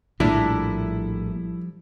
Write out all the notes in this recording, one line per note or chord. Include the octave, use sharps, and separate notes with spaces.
A#1 A2 F3 G3 D4 E4 A#4